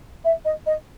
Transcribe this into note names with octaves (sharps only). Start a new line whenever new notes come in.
E5
D#5
D#5